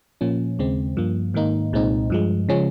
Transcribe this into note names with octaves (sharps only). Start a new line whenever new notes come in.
A#2 F3 A#3 C#4
D#2 C#3 G#3 C4
G2 F3 A#3
G#2 D#3 A#3 D#4
C2 A#2 G#3 C4 D#4
G2 F3 G#3
C#3 F3 G#3 C#4